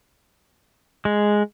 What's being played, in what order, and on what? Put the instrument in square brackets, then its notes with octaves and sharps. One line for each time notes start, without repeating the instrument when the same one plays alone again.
[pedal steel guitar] G#3